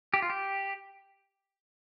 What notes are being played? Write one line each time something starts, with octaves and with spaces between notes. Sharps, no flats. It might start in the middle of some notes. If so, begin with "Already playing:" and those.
G4
F4
G4